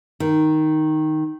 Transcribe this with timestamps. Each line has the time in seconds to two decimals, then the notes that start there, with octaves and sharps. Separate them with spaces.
0.20 D#3